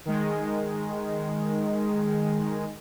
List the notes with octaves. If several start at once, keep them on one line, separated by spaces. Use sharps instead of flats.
D#3 G#3